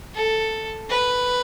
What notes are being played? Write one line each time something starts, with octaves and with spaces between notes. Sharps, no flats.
A4
B4